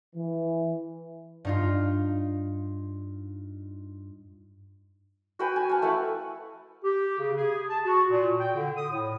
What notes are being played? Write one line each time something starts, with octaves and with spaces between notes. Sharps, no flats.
E3
G2 D#4 F4
F#4 B4 G5 G#5
G#5
F5 A5
A3 E4 B4 F#5
G4
C#3
G#4
A5
F#4
A#2
G5
D3
D#6
A2